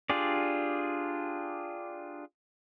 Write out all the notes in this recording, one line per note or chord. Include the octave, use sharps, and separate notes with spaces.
D4 F4 G4 G#4 D5